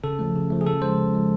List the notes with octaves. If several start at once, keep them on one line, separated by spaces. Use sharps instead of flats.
C#3 A4
F3 A3
C#3
F3 A3
G#4
C#3 A4
F3 G#3 C5
C#3
F3 G#3